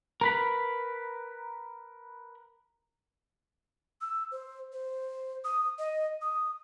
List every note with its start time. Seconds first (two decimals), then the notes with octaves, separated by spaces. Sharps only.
0.21 A#4 B4 B5
4.01 E6
4.32 C5
4.72 C5
5.44 D#6
5.78 D#5
6.22 D#6